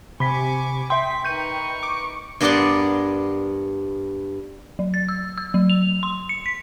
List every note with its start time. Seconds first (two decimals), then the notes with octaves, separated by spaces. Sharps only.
0.20 C3 G#5 B5 C#6 D6 B6
0.90 E5 G5 C6 B6
1.24 D#4 A#4 B4 C#6 G6 D#7
1.83 D6
2.41 G2 B3 A#4 D5 F#5 C6
4.79 F#3
4.94 A6
5.09 E6
5.38 E6
5.54 F#3
5.70 F7
6.03 C6
6.29 C#7
6.46 B6